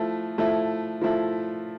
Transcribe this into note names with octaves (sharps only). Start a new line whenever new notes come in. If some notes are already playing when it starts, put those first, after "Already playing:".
Already playing: F3 A3 E4
F3 A3 E4
F3 A3 E4